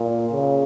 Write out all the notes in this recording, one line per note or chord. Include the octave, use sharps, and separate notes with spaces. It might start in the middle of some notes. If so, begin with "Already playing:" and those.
Already playing: A#2
C#3